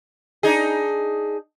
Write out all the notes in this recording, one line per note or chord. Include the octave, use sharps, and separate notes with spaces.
D4 D#4 G#4